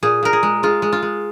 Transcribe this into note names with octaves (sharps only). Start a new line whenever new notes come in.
A#2 G#4
A#2 A#4
G#4
G#3
G#3 F4
G#3
F4
G#3